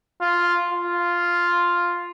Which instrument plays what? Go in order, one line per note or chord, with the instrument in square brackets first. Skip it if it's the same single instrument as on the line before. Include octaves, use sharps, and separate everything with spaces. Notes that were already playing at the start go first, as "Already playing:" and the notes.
[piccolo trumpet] F4
F4